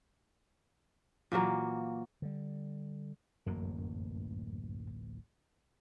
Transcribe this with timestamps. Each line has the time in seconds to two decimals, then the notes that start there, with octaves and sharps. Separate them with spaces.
1.32 A#2 E3 F#3 A#3
2.22 D3 G3
3.47 D1 A1 F#2 A#3